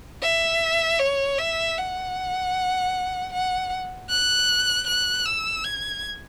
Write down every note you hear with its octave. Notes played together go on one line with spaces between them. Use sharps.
E5
C#5
E5
F#5
F#5
F#6
F#6
E6
G#6